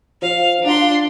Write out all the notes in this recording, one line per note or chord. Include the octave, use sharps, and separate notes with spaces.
F3 F5
D4 F4 A#5 C6